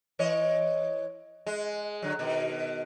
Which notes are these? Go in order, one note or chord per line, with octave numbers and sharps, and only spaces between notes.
E3 C#5 D#5
G#3
D3 F#3
B2 D#3